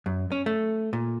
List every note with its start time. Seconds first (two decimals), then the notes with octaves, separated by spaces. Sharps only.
0.06 F#2
0.32 C#4
0.46 A3
0.93 A#2